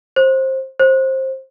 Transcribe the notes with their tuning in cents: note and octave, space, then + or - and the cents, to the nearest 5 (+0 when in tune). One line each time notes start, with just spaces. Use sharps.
C5 +20
C5 +20